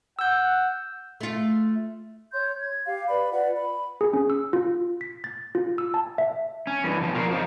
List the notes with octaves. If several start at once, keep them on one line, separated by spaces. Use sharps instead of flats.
F#5 E6 G6
A3 F4
C#5 C6 G6
G#6
G4 F5
B4 D5 B5
F4 B4 D5 F#5
B5
G#4
C#4
E6
F4
B6
A6
F4
E6
A5
E5
C#4
G2 E3
B2 F3
F4 A#4 C#5 D5 E5 F5
F2 F3 D#4